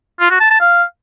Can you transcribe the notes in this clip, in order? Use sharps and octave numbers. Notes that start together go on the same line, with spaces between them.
F4
F#4
A5
A5
F5